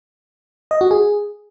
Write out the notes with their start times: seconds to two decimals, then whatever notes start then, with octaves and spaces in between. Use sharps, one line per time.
0.71 D#5
0.81 F#4
0.91 G#4